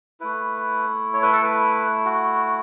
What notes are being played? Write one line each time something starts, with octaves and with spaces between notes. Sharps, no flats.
A3 E4 B4
C#5
B4
A4
B4
F#4